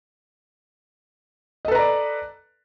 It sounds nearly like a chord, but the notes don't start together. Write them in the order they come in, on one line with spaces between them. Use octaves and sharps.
D#5 A4 B4 A#5 D5